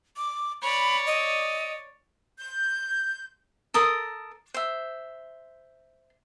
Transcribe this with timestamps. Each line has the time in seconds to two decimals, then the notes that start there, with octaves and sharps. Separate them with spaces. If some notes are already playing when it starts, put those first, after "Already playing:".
0.17 D6
0.62 C#5 D5 B5
1.07 D#5
2.39 G6
3.74 A4 A#4 D#6
4.54 C5 E5